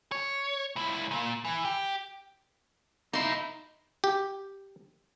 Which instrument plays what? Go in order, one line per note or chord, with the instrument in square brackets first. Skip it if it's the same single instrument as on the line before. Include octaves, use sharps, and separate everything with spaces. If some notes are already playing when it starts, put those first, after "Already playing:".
[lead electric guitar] C#5
C#2 E4
A#2
E3
G4
[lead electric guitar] A#3 E4 [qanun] D#4 C6
[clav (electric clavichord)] G4